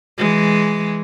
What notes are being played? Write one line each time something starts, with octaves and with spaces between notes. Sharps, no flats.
E3 G#3